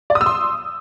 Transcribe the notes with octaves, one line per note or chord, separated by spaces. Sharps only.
D5
D#6
E6
C6